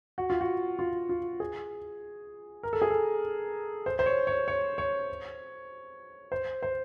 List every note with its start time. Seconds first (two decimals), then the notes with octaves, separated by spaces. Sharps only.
0.18 F#4
0.30 F4
0.41 F#4
0.79 F4
1.09 F4
1.40 G#4
2.63 A#4
2.73 A4
2.82 G#4
2.90 A4
3.86 C5
3.99 C5
4.06 C#5
4.27 C#5
4.48 C#5
4.78 C#5
6.32 C5
6.63 C5